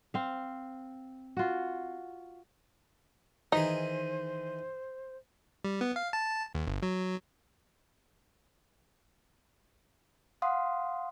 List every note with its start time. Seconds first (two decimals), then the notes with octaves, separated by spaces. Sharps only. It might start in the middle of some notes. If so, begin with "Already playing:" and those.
0.14 C4 F5
1.37 F4 F#4
3.52 D#3 E3 D#4 G#4 C5
5.65 G3
5.81 B3
5.96 F5
6.13 A5
6.55 D#2
6.67 G1
6.83 F#3
10.42 F5 F#5 C6 D#6